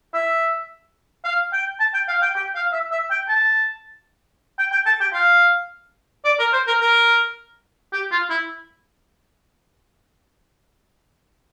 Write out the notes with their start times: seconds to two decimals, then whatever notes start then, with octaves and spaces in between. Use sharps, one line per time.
0.14 E5
1.25 F5
1.53 G5
1.80 A5
1.94 G5
2.08 F5
2.22 G5
2.36 G5
2.55 F5
2.73 E5
2.92 E5
3.11 G5
3.29 A5
4.59 G5
4.72 G5
4.86 A5
5.01 G5
5.13 F5
6.25 D5
6.39 A#4
6.53 C5
6.67 A#4
6.81 A#4
7.93 G4
8.11 F4
8.30 E4